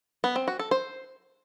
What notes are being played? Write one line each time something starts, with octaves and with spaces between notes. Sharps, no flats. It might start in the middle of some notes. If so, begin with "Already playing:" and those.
B3
C4
F#4
A4
C5